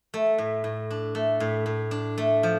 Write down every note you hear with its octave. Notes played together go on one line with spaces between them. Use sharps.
A3
A2
A2
D4
A3
A2
A2
D4
A3
F3